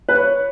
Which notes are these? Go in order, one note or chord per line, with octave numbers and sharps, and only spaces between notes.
B4
C#5